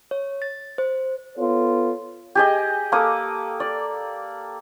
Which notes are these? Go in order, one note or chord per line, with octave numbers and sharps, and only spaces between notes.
C#5
A6
C5
B3 F4 A4 C#5
G4 G#4 D#5
A#3 A4 D6 D#6
D5